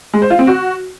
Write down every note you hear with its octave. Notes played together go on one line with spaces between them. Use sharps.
G#3
C5
F4
C4
F#4